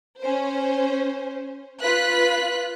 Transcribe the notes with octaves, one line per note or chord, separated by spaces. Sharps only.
C#4 C5
F4 B4 F#6 B6